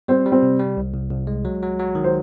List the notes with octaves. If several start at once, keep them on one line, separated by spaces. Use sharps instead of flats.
G3 C4 C5
G3
C4 C5
C3
G3
C2
C2
C2
G#3
F#3
F#3
F#3
D#3
C5